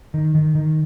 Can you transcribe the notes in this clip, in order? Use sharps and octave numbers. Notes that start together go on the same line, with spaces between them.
D#3
D#3
D#3